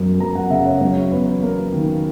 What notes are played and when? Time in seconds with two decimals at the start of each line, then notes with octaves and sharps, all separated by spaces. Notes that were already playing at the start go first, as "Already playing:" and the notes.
Already playing: F#2 F#3
0.20 F#2 A#5
0.35 F#5
0.50 C#3 E5
0.66 C#5
0.81 F#3 C#5
1.11 E2 B4
1.42 A#3 A#4
1.73 D#3